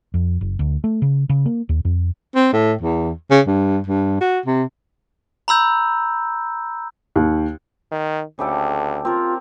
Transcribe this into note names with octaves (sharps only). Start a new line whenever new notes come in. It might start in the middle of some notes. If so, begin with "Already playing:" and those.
F2
F#1
D2
A3
C#3
C#3
A#3
D#2
F2
C4
A2
E2
C#3
G2
G2
F#4
C3
A#5 B5 E6 G6
D#2
D#3
D2 C#3 G4 A4
C4 F4 A#4